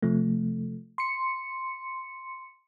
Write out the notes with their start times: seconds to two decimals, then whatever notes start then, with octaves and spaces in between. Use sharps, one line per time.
0.02 C3 F3 A3
0.98 C6 C#7